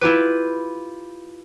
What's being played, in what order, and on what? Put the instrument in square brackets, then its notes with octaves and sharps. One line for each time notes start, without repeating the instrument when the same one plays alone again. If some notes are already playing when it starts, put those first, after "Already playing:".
[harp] E4 F4 G4 B4